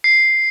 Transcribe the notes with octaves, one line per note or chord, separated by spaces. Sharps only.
C7